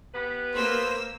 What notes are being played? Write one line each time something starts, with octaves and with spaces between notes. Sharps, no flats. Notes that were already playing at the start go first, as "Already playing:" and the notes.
B3 G4 B4
A#3 C5 E6